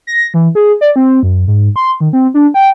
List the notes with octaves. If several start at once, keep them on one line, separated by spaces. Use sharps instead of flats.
A#6
E3
G#4
D5
C4
F#2
G#2
C6
D#3
C4
D4
G5